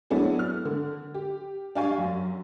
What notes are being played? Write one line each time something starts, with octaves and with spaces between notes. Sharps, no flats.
F#3 A3 B3 D4 E4 G#4
F6
D3
G4
D4 G4 F5 G5 G#5 C#6
F#2